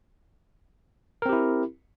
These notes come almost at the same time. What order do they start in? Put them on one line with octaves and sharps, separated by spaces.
A#4 C4 G4 E4